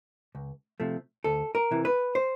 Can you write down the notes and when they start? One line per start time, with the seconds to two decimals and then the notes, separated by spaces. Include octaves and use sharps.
0.35 C#2
0.80 C3 F3 A3
1.24 D2 A4
1.55 A#4
1.71 C3 E3
1.85 B4
2.15 C5